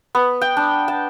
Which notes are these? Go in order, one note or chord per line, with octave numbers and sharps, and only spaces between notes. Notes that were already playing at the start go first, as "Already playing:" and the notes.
B3
G5
D4
A5